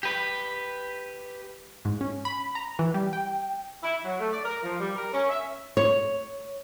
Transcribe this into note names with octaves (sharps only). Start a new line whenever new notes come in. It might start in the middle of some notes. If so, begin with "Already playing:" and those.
G4 B4
G#2
C#4
B5
A#5
E3
G3
G5
E4
F#3
A3
D5
A#4
F3
G3
A#4
C#4
E5
C#5